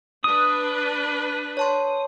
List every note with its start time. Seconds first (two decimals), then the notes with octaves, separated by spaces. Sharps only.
0.24 D4 B4 D#6
1.57 C#5 A5 C6